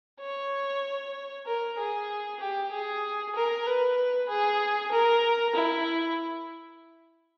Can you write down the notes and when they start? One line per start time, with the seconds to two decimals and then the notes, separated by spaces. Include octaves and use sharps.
0.21 C#5
1.46 A#4
1.78 G#4
2.40 G4
2.71 G#4
3.36 A#4
3.67 B4
4.29 G#4
4.92 A#4
5.55 E4